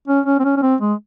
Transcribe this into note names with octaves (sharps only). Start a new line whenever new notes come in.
C#4
C#4
C4
C#4
C#4
C4
G#3